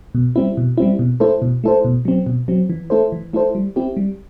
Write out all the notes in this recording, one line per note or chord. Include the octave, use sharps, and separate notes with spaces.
B2
G3 C4 E4
B2
G3 C4 E4
B2
A3 E4 A4 C5
B2
A3 E4 A4 C5
B2
F#3 C4
B2
F#3 C4
E3
A3 E4 A4 C5
E3
A3 E4 A4 C5
G3
C4 E4 G4
G3